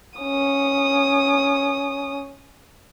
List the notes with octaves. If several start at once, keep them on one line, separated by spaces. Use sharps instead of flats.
C#4 D#6